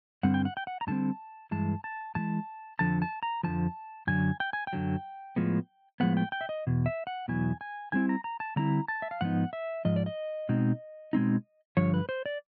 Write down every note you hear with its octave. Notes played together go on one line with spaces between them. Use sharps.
G2 D3 G3 C4 F#5
G5
F#5
G5
F#5
A#5
G2 D3 G3 C4 A5
G2 E3 G#3 A5
A5
G2 E3 G#3 A5
F2 D3 F3 A5
A5
A#5
F2 D3 F3 A5
F#2 D3 F#3 G#5
G5
G#5
G5
F#2 D3 F#3
A2 F3 G#3 B3
A2 F3 G#3 B3 F#5
G5
G5
E5
D#5
E2 B2
E5
F#5
E2 B2 F#3 B3 E4 G#5
G#5
D3 G3 C4 E4 G#5
A#5
A#5
A5
D3 G3 C4 E4 A#5
A5
E5
F5
G#2 F3 B3 D#4 F#5
E5
G#2 F3 D#5
D5
D#5
B2 G#3 C4 D#4
B2 G#3 C4 D#4
G2 D3 F3 C#5
B4
C5
D5